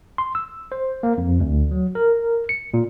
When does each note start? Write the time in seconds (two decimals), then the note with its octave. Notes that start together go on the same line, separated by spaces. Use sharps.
0.18 C6
0.35 E6
0.72 C5
1.03 A#3
1.18 F2
1.40 D2
1.71 F#3
1.95 A#4
2.49 C#7
2.74 A#2